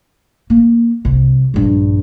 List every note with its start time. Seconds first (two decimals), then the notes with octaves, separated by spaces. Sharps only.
0.50 A#3
1.05 C2
1.54 A#1 G2